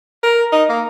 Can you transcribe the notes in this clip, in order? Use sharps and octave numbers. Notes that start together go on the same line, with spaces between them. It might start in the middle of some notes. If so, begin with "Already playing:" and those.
A#4
D#4
A#3